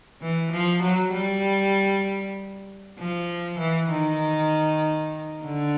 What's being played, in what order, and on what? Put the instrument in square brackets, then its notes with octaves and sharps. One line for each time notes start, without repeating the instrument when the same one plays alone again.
[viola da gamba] E3
F3
F#3
G3
F3
E3
D#3
D3